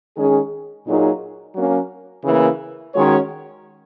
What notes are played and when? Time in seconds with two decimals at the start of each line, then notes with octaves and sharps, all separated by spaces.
0.16 D#3 G#3 C#4 G#4
0.85 A#2 F#3 A#3 D#4 G#4
1.55 F#3 A#3 C#4
2.24 C#3 E3 A#3 E4
2.93 D#3 G#3 C#4 F#4 C#5